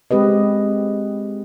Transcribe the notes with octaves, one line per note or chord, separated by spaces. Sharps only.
G#3 C4 G4 B4 D#5